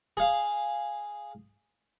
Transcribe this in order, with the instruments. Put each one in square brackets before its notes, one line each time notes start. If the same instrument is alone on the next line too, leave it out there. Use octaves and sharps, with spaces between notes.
[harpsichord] G#4 F5